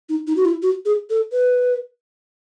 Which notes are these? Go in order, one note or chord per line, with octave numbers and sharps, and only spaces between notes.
D#4
D#4
F#4
E4
F#4
G#4
A4
B4